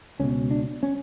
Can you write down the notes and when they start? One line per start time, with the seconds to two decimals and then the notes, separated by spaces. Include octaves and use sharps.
0.19 C#2 B2 C#4
0.51 D4
0.83 C#4